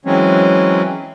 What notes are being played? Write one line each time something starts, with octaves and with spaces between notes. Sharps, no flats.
E3 F#3 G#3 C4 C#4